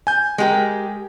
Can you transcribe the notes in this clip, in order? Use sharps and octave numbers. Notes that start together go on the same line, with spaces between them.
G#5 G6
G#3 G4 A#4